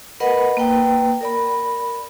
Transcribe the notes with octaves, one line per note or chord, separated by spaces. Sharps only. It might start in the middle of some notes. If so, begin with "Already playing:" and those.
A#4 B4 D#5 F#5 B5
A#3 B4 G5
A#4 D5 B5